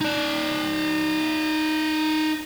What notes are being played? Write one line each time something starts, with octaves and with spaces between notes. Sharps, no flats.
D#4 D5